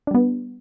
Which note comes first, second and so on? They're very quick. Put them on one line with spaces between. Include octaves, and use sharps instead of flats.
D4 G3 B3